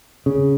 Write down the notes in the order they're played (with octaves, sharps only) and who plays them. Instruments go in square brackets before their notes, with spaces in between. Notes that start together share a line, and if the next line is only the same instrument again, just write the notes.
[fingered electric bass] C#3